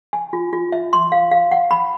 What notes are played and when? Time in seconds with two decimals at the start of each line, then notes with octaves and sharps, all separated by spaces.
0.13 G#5
0.33 F4
0.53 F4
0.72 E5
0.93 C6
1.12 F5
1.31 F5
1.51 F#5
1.71 B5